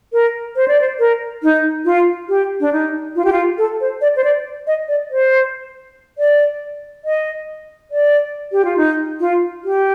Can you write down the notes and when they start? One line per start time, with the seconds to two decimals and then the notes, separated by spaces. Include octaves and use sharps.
0.13 A#4
0.56 C5
0.68 D5
0.81 C5
0.99 A#4
1.43 D#4
1.85 F4
2.29 G4
2.60 D4
2.73 D#4
3.16 F4
3.25 G4
3.32 F4
3.58 A4
3.81 C5
4.01 D5
4.16 C5
4.24 D5
4.67 D#5
4.88 D5
5.10 C5
6.18 D5
7.05 D#5
7.91 D5
8.52 G4
8.65 F4
8.77 D#4
9.20 F4
9.64 G4